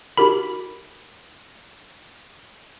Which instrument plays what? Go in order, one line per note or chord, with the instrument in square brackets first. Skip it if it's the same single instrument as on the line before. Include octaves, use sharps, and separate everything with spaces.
[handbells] D#4 F#4 G4 A#4 B5